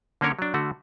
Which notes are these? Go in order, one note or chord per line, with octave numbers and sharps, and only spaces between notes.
D3 A#3 C#4 A#4 C#5
F#3 D4
D3 A3 F#4